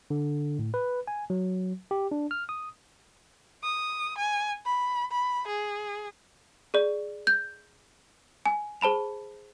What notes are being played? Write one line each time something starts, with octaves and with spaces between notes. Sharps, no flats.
D3
A2
B4
G#5
F#3
G4
D4
F6
D#6
D#6
G#5
B5
B5
G#4
G#4 D5
G6
G#5
G#4 C5 A5 B5 F7